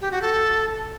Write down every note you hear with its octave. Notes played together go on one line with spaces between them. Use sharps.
G4
F#4
A4